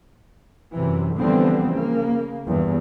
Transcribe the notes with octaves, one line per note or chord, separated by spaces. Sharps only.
F#2 C3 E3
D3 E3 F3 G3 B3 C4
C#3 A#3
E2 G2